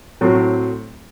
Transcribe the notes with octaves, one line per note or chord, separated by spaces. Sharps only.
A2 F#3 C4